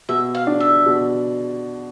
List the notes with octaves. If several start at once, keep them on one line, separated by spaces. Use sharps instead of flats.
B2 E5
F5
D4
E5
B2